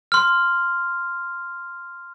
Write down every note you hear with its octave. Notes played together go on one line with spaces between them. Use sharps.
C6 F6